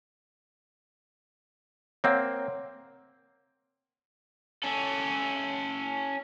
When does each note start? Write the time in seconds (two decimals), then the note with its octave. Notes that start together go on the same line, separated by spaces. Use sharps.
2.04 A#3 C4 C#5 F#5
4.64 C#4 A4